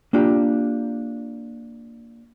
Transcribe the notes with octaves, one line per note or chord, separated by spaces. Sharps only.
A#3 D4 F4 G4